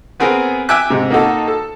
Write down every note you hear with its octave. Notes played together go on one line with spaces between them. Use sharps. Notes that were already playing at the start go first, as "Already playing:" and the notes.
B3 C4 G#4 A#4
E5 G5 G#5 D6 F#6
G#2 C3
A#3 D#4 F#4 A4
A4